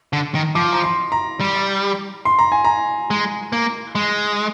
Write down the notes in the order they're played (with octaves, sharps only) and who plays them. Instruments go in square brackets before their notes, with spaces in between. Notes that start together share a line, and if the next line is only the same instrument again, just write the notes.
[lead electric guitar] D3
D#3
[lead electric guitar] F3 [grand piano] D6
[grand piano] A#5
C6
A#5
[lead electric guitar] G3
[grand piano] C6
A#5
G#5
A#5
[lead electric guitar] G#3
A#3
G#3